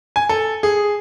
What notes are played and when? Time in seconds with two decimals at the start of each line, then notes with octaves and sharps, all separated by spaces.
0.16 G#5
0.29 A4
0.63 G#4